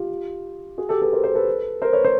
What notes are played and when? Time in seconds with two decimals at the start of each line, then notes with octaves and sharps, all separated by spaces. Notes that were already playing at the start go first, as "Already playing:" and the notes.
Already playing: F4 G4
0.78 F#4 G#4
0.89 G4 A4
1.01 A4 B4
1.13 A#4 C5
1.24 A#4 C5
1.35 A4 B4
1.82 A#4 C5
1.93 B4 C#5
2.04 A#4 C5